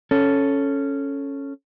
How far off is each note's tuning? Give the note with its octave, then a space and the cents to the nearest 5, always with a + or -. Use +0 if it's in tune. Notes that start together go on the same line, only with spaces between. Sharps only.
C#4 +0 A4 +0